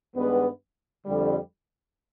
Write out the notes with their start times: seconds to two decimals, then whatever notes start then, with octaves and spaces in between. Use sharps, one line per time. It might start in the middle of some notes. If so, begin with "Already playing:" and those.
0.15 G2 D#3 G#3 B3
1.05 F2 D3 G3